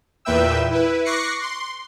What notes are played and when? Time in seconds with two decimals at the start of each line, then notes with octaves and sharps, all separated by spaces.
0.25 E2 A#2 B4 E5 G5 E6
0.71 E4 B4
1.05 C#6 D6 F#6 A#6 C7 C#7
1.41 C6